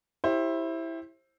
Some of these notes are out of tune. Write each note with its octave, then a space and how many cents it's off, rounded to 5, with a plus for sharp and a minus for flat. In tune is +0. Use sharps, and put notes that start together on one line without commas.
E4 +0 G4 +0 C5 +25